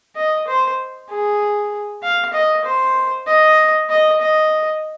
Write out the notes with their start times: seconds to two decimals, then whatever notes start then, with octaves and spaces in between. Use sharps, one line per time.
0.16 D#5
0.47 C5
1.10 G#4
2.03 F5
2.33 D#5
2.65 C5
3.27 D#5
3.90 D#5
4.21 D#5